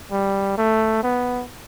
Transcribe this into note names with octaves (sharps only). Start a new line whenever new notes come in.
G3
A3
B3